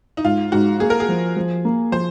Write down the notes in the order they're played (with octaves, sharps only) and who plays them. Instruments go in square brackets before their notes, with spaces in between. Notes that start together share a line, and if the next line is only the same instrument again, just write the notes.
[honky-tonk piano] D#4
[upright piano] G#2 [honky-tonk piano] F4
[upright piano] G#2 [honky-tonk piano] F#4
[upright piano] A#3 [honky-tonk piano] G#4
[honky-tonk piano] A#4
G#4
[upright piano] F3
F3
A#3
[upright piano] F3 [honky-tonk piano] C5